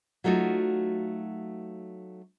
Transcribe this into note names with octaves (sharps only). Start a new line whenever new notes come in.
F#3 A3 D#4 F4 F#4